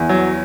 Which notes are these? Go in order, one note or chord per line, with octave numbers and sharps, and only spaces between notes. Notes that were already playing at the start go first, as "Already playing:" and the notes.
Already playing: E2
F#3